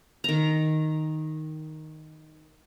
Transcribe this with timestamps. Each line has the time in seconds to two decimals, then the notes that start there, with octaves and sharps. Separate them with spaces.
0.24 D#3 A#5